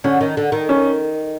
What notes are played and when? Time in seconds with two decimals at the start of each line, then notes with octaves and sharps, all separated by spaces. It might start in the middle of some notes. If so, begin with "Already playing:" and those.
0.04 D3 C#4
0.21 D#3
0.37 D3
0.52 D#3
0.69 C#4